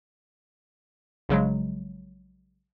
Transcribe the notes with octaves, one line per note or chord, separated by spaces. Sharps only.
A#1 C#3 F#3 G#3